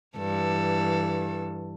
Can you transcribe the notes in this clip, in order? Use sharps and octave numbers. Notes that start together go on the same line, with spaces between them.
G2 E3 A4